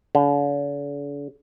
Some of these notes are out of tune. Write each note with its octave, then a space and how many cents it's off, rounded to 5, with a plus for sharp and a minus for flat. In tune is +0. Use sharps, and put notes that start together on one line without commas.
D3 -45